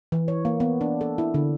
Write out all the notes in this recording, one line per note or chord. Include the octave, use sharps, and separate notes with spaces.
E3
C#5
A#3
B3
D4
A4
E4
D3